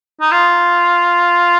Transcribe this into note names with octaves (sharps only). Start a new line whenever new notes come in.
D#4
F4